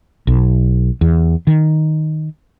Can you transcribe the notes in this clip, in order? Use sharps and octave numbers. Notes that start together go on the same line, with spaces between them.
B1
E2
D#3